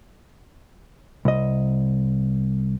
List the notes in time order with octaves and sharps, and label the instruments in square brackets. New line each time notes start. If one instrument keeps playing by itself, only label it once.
[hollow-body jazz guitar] C2 D#5